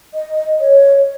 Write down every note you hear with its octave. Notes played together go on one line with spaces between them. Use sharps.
D#5
C#5